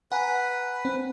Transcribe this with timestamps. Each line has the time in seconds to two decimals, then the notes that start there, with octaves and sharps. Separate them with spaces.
0.12 B4 F#5 G#5 A#5
0.85 C4